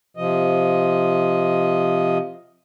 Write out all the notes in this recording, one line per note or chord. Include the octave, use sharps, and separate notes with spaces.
C3 F3 D#5